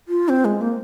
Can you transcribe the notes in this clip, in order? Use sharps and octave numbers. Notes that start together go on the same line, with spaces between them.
F4
C4
G#3
A#3